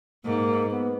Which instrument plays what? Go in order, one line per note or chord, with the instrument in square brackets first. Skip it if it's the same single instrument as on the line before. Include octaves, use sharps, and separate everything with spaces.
[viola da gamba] G#2 [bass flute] A#3
[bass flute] B3